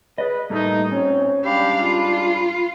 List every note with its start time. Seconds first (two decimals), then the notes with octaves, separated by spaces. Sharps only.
0.18 G#4 B4 D5 D#5
0.50 A2 G3 A3 A#3 D#4
0.92 A#2 C4 C#4 C#5
1.44 G#2 G3 D4 G4 F5 B5
1.82 F4